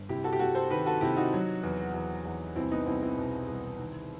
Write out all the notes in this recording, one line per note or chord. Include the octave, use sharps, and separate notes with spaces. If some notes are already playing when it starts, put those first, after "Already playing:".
Already playing: G1
C3 E4 G4
F#4 A4
G4
C3 F#4 A4
A4 C5
D#3 G4 B4
F#4 A4
C3 E4 G4
D#4 F#4
F#3
E2
E2
E2
C2 C4 E4
B3 D#4
C2 C4 E4
C4 E4
B2
C2
D#3